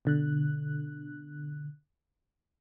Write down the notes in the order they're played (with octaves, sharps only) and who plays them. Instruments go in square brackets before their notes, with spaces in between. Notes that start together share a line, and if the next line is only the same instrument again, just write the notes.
[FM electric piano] B2 D3 F#6